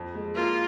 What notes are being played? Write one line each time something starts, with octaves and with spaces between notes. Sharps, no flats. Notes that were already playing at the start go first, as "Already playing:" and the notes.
Already playing: F2
G#3
A#3 F4